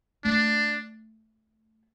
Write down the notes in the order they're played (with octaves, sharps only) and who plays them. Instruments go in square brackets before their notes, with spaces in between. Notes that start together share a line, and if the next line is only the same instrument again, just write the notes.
[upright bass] A3 [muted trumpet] D4